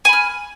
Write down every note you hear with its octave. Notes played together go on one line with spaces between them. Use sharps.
G#5 B5 F6